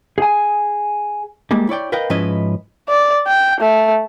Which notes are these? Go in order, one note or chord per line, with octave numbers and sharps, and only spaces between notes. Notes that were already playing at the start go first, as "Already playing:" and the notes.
G#4 G#5
G3 G#3 A#3
E4 C#5 D5 G5
A#4 B4 D#5 F5 G5
G#2 F3 C#4 E4 B4 D#5
D5
G5
A3